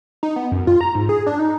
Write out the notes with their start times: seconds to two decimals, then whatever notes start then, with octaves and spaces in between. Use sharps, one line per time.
0.23 D#4
0.36 B3
0.52 F#2
0.67 F4
0.81 A#5
0.95 G#2
1.09 G#4
1.26 D4
1.39 D#4